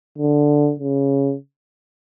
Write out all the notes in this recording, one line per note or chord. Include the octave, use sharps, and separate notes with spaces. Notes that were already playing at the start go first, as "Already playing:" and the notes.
D3
C#3